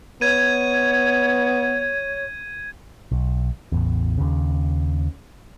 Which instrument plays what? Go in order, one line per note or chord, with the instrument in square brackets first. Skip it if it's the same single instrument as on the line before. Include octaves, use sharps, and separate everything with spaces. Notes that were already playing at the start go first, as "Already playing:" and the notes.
[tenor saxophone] B3 [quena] C#5 [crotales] G#6 D#7
[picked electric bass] B1
A1 E2
D#2 C#3